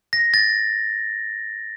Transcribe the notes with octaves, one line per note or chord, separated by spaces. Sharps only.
A#6
A6